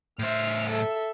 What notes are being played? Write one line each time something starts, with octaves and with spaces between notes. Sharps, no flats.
A2 C5 E5 F6
A4 E5